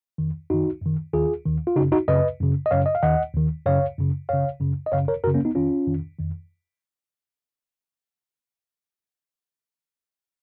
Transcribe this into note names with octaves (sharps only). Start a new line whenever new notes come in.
F2 D#3
F#2 D#3 D#4 F#4
F#2 D#3
D#2 D#3 F4 G#4
D#2 D#3
F4
F#2 C#3 D#4 F#4
D#4 F#4
F#2 C#3 B4 D#5
F#2 C#3
D#5
F#2 C#3 C#5 F5
D#5
F5
D#2 D#3 D#5 F#5
D#2 D#3
F#2 C#3 C#5 F5
F#2 C#3
F#2 C#3 C#5 F5
F#2 C#3
D#5
F#2 C#3 C#5 F5
A#4 C#5
F#2 C#3 F#4 A#4
A#3 C#4
B3 D#4
F2 D#3 C#4 F4
F2 D#3
F2 D#3